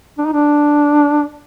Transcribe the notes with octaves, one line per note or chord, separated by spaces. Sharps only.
D4
D#4
D4